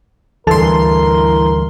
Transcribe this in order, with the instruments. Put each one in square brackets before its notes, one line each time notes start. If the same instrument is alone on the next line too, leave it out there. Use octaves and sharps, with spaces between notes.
[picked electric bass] D2 G2 [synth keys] E3 C6 [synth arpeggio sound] A4 A5 [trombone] A#4